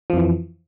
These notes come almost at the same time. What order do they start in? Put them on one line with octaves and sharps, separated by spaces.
F3 F2 E3